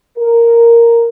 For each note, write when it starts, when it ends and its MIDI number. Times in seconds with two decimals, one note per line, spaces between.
0.18 1.09 70